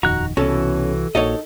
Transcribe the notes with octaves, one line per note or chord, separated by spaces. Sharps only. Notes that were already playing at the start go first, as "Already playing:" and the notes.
D#1 F2 D#3 F#4 A#5 F#6
C2 B2 E3 C#4 F#4 A4
A#1 A#2 D#4 F#4 A4 C#5 D#5